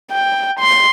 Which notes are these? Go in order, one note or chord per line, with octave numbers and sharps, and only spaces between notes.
G5
C6